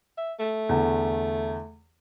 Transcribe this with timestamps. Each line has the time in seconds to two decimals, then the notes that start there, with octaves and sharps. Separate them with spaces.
0.17 E5
0.39 A3
0.69 E2 D3